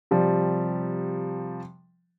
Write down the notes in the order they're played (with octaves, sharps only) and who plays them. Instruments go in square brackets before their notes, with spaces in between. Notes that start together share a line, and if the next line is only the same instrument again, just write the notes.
[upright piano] C3 F3 G3